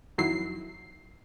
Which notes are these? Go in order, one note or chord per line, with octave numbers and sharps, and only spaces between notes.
F2 D#3 F#3 E4 C7